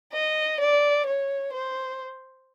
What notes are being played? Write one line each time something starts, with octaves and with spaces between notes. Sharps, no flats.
D#5
D5
C#5
C5